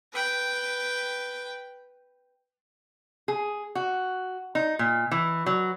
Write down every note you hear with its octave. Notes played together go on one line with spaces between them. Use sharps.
B4 G5
G#4
F#4
D#4
A#2
E3
F#3